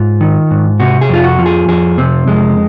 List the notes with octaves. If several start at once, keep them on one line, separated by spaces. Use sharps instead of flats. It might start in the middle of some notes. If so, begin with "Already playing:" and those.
Already playing: G#2 F4
D#3
G#2
C3 F#4
G#4
F2 F4
F#4
F3
G#4
F2 G#4
C3 C4
F2 G#3